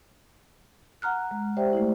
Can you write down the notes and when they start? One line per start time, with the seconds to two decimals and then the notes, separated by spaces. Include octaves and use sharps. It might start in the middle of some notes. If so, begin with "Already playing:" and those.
1.02 F#5 A#5 F6 F#6
1.31 G#3
1.57 G4 C5 D5 E5 G5
1.73 A3 E4